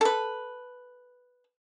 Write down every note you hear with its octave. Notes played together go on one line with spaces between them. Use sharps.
A4 B4